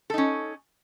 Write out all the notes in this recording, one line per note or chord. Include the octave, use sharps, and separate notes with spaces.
C#4 D#4 A4